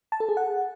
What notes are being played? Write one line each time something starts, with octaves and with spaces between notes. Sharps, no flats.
A5
A4
G#4
F#5